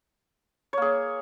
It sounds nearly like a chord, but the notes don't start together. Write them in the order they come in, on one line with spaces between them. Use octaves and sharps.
C#5 A#3 G#4